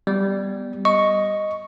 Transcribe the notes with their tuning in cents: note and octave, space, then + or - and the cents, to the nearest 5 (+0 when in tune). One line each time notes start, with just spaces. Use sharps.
G3 +0 B3 +0
D#5 +0 C#6 +0